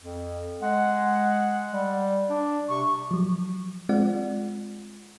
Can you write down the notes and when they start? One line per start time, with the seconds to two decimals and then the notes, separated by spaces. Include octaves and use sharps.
0.02 F2
0.61 G#3 F#5
1.73 G3
2.30 D4
2.69 C3 C#6
3.11 F3 F#3
3.89 G#3 C4 F4 D5 F#5